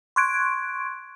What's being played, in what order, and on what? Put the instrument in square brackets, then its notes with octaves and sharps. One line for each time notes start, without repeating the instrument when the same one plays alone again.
[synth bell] C6 C#6 F#6 G#6 D7